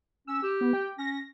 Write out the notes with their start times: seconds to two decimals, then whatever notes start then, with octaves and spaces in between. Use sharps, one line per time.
0.27 C#4 E6
0.43 G4
0.61 B3
0.73 G5
0.98 C#4 A#6